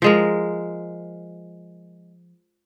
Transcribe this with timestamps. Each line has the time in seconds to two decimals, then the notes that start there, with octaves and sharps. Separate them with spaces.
0.02 F3 G#3 A#4